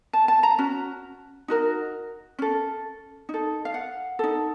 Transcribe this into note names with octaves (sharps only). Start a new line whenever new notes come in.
A5
A5
A#5
C#4 F#4
D#4 F#4 A#4
C#4 A4
D#4
A4
F5
F#5
D#4 A4